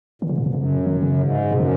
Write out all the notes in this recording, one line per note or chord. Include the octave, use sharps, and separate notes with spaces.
A#2 D#3
G#2 C#3
F#2 A#2
G#2 B2
F#2 C#3
D#3
C#3
G#2
F#2 B2
C#3